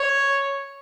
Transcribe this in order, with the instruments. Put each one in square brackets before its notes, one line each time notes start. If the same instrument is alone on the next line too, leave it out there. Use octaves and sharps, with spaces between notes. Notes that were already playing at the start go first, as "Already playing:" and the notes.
Already playing: [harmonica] C#5